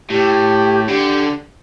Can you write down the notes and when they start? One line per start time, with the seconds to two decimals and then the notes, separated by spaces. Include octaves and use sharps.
0.09 A2 G4
0.87 D3 G4